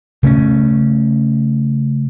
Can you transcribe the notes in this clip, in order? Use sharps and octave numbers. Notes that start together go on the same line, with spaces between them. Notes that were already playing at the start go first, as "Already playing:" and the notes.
C#3 A3 C#4